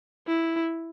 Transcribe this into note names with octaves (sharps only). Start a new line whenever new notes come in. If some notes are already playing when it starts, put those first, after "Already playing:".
E4